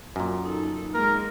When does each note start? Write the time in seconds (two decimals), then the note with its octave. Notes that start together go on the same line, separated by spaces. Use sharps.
0.16 F#2 A#2
0.45 D#4 A4
0.93 G#3 A#3 A#4